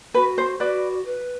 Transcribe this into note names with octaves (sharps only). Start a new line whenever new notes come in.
F#4 B4
C5
F#4 B4 D5
B4